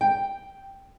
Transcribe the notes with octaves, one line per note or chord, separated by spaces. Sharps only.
G5